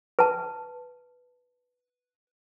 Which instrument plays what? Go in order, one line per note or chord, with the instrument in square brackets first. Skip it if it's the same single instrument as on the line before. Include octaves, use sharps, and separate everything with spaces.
[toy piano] B4 A5